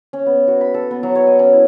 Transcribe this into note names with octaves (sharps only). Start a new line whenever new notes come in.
C#4
B3
F#4
B5
A4
B3
F#3
C#5
D#5
C#4
E4